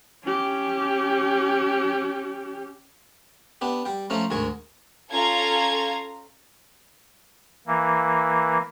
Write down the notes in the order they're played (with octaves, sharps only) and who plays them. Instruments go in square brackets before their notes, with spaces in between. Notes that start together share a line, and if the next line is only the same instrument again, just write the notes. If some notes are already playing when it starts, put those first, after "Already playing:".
[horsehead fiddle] C#4 G4
[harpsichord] B3 D4 G4
G3 G5
F3 A3 C#4 D#4
D2 G#2 D#3 G#5 C#6
[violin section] C#4 F4 A4 F5 A#5 G#6
[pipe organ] E3 A#3